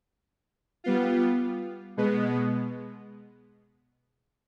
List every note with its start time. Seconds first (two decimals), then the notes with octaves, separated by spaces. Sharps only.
0.84 G3 B3 F4
1.97 B2 G#3 B3